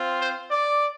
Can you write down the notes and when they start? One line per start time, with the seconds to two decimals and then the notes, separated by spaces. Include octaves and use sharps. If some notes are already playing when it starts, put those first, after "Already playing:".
Already playing: C4 F4
0.21 C5
0.51 D5